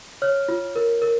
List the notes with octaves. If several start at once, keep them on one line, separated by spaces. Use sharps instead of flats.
C#5 F6
F4
A#4
A#4